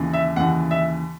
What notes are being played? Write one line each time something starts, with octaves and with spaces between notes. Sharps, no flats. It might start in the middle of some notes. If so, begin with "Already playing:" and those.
Already playing: D#2 C#3 E3
E5
D#2 C#3 E3 F#5
E5